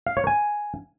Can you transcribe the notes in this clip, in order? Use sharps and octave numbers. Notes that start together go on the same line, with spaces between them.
F5
C#5
G#5